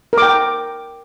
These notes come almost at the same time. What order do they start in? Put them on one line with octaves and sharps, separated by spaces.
A#4 D6 G5